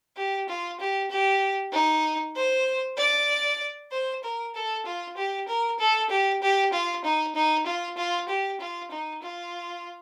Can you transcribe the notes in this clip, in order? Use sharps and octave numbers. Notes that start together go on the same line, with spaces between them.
G4
F4
G4
G4
D#4
C5
D5
C5
A#4
A4
F4
G4
A#4
A4
G4
G4
F4
D#4
D#4
F4
F4
G4
F4
D#4
F4